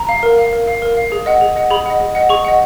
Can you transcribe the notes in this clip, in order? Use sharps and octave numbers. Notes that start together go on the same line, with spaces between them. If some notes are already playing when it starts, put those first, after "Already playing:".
Already playing: A#5
F5
A#4
F5
A#4
F5
A#4
F5
G#4
D#5 F#5
G#4
D#5 F#5
G#4 B5
D#5 F#5
G#4
D#5 F#5
G#4 C#6
D#5 F#5